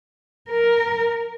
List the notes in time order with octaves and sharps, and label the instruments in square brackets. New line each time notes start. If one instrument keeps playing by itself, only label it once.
[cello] A#4